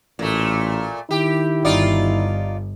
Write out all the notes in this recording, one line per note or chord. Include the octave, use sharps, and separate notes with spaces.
A1 A#2 A3
D#3 E4 G4
G1 D#4 F4 D5